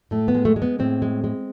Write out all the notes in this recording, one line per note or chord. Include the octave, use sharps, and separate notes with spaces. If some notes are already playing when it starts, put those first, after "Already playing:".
A2 A3
B3
G#3
A3
G#3
B3
A2 C4
G#3
G#3